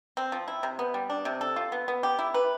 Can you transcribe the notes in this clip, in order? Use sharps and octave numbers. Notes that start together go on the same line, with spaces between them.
C4
F3
E4
C3
B3
G3
D4
C3
A4
F4
B3
B3
G4
E4
B4